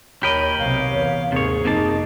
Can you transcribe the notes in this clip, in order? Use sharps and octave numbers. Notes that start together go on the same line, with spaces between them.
D#2 G4 A#4 C#5 D#5 B5
B1 C3 F5
E2
D#2 G#2 C3 G#4 C#5
F#1 C3 A#3 D#4 A5